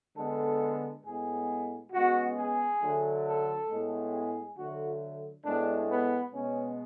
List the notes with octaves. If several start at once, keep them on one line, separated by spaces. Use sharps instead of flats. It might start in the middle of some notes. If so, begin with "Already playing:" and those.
D3 G#3 B3 A4
A2 G#3 B3 G#4
C#3 G#3 B3 F#4
G#4
D3 F#3 A3
A4
A2 G#3 B3
G#4
D3 F#3 A3 F#4
A2 G#3 B3 D4
B3
B2 G#3 B3 C#4